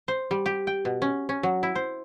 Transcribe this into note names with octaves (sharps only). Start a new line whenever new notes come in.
C5
G3
G4
G5
B2
C#4
C#4
F#3
E4
C5